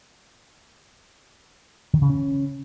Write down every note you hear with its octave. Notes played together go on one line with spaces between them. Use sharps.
D#3
C#3
C#4